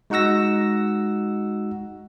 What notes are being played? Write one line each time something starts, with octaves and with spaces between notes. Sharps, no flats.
G#3 D#4 F#4 F#5 E6 A#6